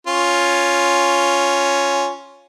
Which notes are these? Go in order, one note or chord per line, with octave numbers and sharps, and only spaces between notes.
C#4 F4